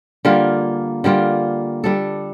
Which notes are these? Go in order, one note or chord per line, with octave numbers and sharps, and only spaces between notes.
D3 G3 A#3 F4
D3 G3 A#3 F4
G3 D4 A4